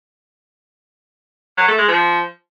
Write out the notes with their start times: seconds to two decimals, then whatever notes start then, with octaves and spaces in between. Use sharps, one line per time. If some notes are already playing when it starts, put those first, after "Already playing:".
1.58 F#3
1.68 A3
1.78 G#3
1.88 F3